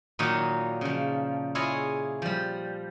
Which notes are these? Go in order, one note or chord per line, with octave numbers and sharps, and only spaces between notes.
A#2 D#3 F#3 D#4 F#4
C#3 F3
E4 F4 G#4 C#5 D#5 G#5
F3 G3